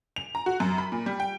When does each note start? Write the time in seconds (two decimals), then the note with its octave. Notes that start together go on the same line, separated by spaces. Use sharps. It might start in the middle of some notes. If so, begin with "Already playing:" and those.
0.16 F7
0.35 A#5
0.46 F#4
0.60 F#2
0.78 B5
0.92 A#2
1.06 G3
1.20 G5